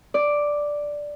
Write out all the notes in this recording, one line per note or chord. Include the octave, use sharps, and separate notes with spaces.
D5